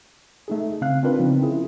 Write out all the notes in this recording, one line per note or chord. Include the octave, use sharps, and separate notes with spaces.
A3 D#4 G#4
C#3 C4 F5 F#6
C4 D4 D#4 F4 A#4 B4
C#3 F3 B3 C4 D#4
C#4 E4 F4 G#4 A#4